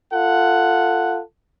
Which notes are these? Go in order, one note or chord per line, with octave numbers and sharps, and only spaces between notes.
F4 A4 F#5